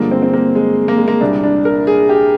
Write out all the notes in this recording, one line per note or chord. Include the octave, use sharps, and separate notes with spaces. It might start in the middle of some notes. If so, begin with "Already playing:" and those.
Already playing: G2 D3 F3 G#3 A#3
C4
C4
A#3
G#3
A#3
G#3
A#3
C2 A#2 G3 D4
D4
A#4
G#4
G4